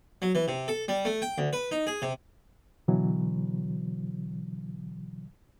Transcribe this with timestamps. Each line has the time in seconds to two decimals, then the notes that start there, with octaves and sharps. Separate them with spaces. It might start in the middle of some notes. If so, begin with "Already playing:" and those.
0.22 F#3
0.35 E3
0.48 C3
0.68 A4
0.88 G3
1.05 A3
1.22 G5
1.38 D2
1.53 B4
1.72 D#4
1.87 G#4
2.02 C3
2.88 B2 D3 E3 F#3